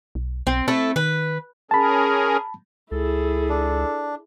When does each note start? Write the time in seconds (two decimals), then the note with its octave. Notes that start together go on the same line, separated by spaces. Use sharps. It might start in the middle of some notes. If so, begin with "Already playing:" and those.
0.15 B1
0.47 B1 C4
0.68 A3 C4 E4 A4
0.96 D#3 B4
1.71 C#4 G#4 A#4 A5 B5
2.91 C#2 E4 G#4 A4
3.49 D4